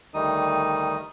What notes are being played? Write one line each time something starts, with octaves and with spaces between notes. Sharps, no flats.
D2 D#3 G3 D#4 D#6